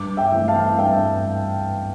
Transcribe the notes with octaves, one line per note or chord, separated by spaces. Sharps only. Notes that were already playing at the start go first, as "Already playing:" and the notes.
Already playing: G2 D6
E5 G5
E3 A3 C4
F5 A5
G2 E5 G5